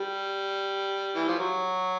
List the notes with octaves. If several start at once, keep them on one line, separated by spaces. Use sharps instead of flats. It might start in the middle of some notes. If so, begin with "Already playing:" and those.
Already playing: G3
E3
F3
F#3